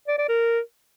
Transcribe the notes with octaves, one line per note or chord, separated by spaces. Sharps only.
D5
D5
A#4